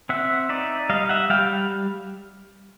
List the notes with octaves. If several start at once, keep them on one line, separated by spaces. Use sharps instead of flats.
C4 E5 F#5
D#4 D5 E5
G3 D#5 F5
E5 F#5
G3 F5 G5